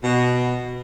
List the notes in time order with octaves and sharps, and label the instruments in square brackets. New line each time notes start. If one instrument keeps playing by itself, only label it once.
[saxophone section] B2